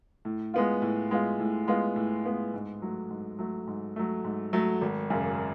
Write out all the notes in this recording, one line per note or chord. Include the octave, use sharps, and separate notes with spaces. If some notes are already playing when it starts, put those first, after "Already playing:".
A2
G#3 B3 F4
A2
G#3 B3 F4
A2
G#3 B3 F4
A2
G#3 B3 F4
G#2
F#3 A3
G#2
F#3 A3
G#2
F#3 A3
G#2
F#3 A3
G#1
F#2 C#3